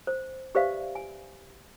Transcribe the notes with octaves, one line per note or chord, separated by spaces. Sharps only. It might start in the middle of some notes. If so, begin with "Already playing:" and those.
C5
G4 B4 C5 D5 E5 F5
G#5